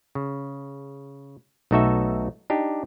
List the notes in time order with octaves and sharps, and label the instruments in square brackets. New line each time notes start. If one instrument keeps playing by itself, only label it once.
[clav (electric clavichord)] C#3
B1 A3 D#4 F#4 A4 E5
D4 D#4 G4